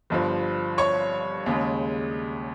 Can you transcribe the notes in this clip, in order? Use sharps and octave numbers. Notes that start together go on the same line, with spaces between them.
G1 G2 F3
C#5 C#6
D#2 C#3 G#3